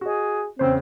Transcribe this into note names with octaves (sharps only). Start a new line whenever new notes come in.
F#4 G#4 D#5
E2 C#3 C4 C5